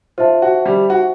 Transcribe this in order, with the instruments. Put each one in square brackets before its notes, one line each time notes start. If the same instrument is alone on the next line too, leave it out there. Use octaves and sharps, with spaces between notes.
[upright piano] F4 [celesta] C5 E5 A5
[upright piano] F#4
G3 G4
F#4